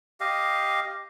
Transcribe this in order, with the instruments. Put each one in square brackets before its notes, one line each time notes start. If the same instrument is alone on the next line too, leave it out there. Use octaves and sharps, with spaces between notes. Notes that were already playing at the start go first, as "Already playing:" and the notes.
[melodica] G4 D#5 F5